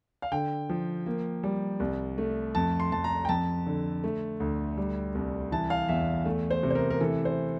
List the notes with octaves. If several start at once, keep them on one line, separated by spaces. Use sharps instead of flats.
F5
D3 G5
F3
A#3
G3
C2
A3
F2 A5
C6
F2 A5
A#5
G5
F2 A5
D3
A3
D2
G3
C2
E3 A5
F5
E2 E5
A3
C5
C3
C5
A#4
A#4
E3 A4
C5